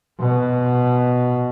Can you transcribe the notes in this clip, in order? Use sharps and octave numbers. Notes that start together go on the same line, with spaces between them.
B2